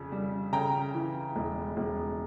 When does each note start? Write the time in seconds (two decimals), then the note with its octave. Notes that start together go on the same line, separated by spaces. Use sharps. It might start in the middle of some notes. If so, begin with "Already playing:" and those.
Already playing: F2 C#3
0.12 G3
0.52 C#3 G5 A#5
0.94 E3
1.36 E1
1.77 E1